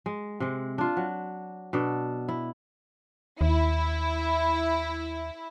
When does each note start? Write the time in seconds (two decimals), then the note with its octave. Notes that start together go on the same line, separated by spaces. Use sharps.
0.06 G#3
0.40 C3 G#3
0.78 D4 F4
0.97 F#3
1.73 B2 D4 A4
2.29 E4
3.41 D#2 E4